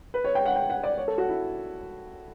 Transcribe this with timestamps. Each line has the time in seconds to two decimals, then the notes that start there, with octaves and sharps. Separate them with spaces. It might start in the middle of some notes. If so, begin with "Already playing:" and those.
0.14 B4
0.24 C#5
0.35 G5
0.46 F#5
0.56 G5
0.70 F#5
0.83 D5
0.98 C#5
1.08 A4
1.18 F#4
1.29 E4